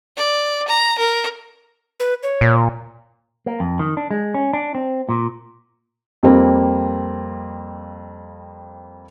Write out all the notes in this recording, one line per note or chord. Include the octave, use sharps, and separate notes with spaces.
D5
A#5
A#4
B4
C#5
A#2
A#3
F2
D#3
D4
G#3
C#4
D4
C4
A#2
F2 G3 A#3 C4